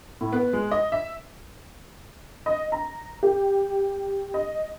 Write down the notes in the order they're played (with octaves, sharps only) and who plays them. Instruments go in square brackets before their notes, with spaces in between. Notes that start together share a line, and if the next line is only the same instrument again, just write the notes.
[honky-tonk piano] A2
B3
G#3
D#5
E5
D#5
A#5
G4
D#5